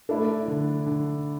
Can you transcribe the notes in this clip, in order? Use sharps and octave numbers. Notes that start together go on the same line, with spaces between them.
A3 D4 E4 A4
D3
D3